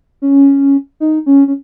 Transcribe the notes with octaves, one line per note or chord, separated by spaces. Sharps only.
C#4
D#4
C#4
C#4